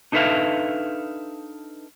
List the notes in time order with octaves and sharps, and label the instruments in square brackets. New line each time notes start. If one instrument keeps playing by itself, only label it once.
[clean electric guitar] D4 D#4 A4 B4 E5 F5